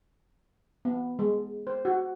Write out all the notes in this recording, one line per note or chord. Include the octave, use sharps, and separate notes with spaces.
B3
G#3
C5
F#4